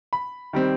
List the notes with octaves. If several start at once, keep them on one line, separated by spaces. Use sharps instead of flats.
B5
D#3 G3 C4